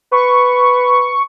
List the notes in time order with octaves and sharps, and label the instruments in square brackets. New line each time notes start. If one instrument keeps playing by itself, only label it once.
[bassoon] B4 [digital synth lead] C#6